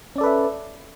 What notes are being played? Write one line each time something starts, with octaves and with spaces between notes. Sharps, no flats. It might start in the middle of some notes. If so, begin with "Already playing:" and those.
C#4 A4 B4 D5 E5